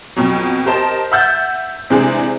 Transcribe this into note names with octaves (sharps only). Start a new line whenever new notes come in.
F2 B2 F#3
G4 A#4 C5 D#5 A5
E5 F#5 E6 G6 A6
C3 E3 G#3 C4 D4 G#4